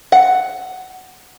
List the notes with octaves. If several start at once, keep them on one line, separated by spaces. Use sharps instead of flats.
F#5